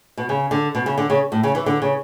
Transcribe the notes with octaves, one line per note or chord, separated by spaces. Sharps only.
B2
C#3
D3
B2
C#3
D3
C#3
A2
C#3
E3
D3
C#3